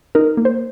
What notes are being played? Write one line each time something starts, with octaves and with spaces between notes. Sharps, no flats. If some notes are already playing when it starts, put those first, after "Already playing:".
D#4 A#4
A#3
C5